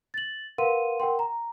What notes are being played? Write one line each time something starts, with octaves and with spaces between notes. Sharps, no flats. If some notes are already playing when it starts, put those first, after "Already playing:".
A6 F#7
A#4 B4 F5 F#5 C6 D#7
A#4 F#5 G5 C6
A#5